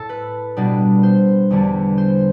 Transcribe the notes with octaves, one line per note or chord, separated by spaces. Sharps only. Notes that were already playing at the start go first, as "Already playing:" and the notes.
Already playing: A2 A4
B4
B2 G3 B3 D4
C5
E2 D3 G3 D4
C5